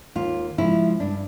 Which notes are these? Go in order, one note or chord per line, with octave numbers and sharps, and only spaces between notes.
D#2 F4
C#3 F3 G#3 E4
G2 D4